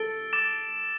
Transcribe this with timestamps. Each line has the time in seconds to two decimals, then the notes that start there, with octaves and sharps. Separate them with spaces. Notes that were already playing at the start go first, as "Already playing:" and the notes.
Already playing: A4 E6 A6 D7 G7
0.33 D6 A6 E7